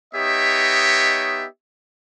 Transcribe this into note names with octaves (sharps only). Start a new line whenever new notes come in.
B3 D#4 G4 C#5 D#5 E5